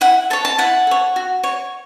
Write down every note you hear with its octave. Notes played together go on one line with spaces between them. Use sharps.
E4 F#5
A4 C#5 A5
A5
E4 F#5
A4 C#5
F#4
C#5